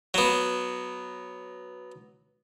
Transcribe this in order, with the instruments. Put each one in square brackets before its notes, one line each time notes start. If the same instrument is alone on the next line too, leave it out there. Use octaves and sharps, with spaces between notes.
[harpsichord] F#3 B3